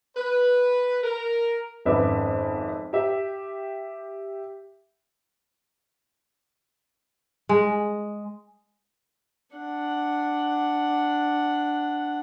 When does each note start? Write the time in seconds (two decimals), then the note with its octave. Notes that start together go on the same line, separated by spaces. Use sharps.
0.16 B4
1.03 A#4
1.85 G#1 F2 C#4 B4 E5 D6
2.93 G4 E5
7.49 G#3
9.56 D4 F#5